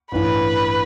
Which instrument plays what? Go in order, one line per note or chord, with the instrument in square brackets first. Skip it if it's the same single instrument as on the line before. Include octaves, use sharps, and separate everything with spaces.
[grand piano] A1 G2 E3 [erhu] B4